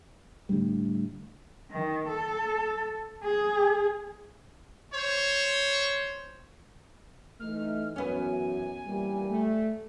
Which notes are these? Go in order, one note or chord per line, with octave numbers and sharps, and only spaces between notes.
A2 D3 G3
D#3
A4
G#4
C5 C#5
E3 A3 D#4 F6
F#2 E3 B3 C#4 G#5
A#2 E3 G3
A3